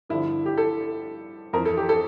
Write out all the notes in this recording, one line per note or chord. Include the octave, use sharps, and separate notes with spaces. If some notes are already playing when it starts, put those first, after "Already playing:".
G2 D3 F3 E4
G4
A4
F2 E3 A#4
A4
G4
A4